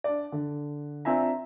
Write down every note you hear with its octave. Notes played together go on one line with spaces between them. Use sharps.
D4 D5
D3
C4 D4 F4 E5 G#5 A#5